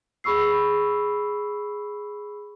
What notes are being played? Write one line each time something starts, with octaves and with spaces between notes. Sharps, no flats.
G#4 B5 C#6 E6 C7